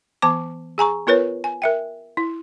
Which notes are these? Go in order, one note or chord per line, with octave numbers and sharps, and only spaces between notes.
E3 B3 A5 D6
G#4 G#5 A#5 C#6
B3 F4 A#4 B4 C#5
G#5
A#4 E5 G5
E4